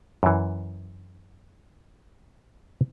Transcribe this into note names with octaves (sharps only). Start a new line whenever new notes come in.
F#2 E3